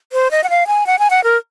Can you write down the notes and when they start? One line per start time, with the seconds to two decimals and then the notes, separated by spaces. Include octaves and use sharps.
0.13 C5
0.31 D#5
0.44 F#5
0.50 F5
0.67 G#5
0.87 F#5
0.99 G#5
1.10 F#5
1.24 A#4